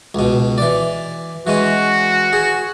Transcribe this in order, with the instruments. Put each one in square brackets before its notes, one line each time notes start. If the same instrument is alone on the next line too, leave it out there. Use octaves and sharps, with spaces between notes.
[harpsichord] C#2 B2
E3 D5
[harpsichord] E3 G#3 C#4 [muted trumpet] F#4
[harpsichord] G#4